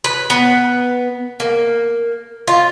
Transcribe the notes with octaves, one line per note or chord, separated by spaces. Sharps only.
B4
B3
A#3
F4